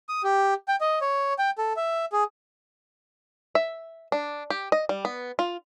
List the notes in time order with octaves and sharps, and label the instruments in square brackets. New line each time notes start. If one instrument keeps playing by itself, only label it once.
[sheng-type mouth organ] D#6
G4
G5
D#5
C#5
G5
A4
E5
G#4
[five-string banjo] E5
D4
G4
D#5
G3
B3
F4